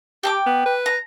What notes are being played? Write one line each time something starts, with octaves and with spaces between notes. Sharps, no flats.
G4 G5 A5 D6
B3
B4
A#5